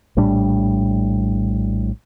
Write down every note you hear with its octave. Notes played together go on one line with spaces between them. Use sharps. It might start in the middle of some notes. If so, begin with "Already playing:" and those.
A#1 A2 G3 D4